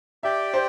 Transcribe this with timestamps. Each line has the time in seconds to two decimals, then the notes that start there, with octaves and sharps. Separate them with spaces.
0.23 G4 D5 E5 G5
0.54 C5